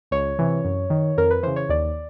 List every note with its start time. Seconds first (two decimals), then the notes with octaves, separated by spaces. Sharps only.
0.11 C#2 C#5
0.39 C3 E3
0.64 F#2
0.90 D#3
1.17 F2 A#4
1.31 B4
1.43 C#3 E3 C5
1.56 C#5
1.69 D#2 D5